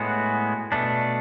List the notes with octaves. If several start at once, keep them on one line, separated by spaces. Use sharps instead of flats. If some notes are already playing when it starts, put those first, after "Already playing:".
Already playing: A2 G#3 B3 F#4
B2 A3 D4